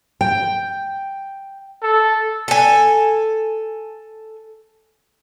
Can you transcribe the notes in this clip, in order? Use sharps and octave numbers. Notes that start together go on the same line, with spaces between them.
G5
A4
A4 G#5